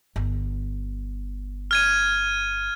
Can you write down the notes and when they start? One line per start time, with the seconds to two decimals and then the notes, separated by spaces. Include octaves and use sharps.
0.16 G1
1.71 F6 G#6 D#7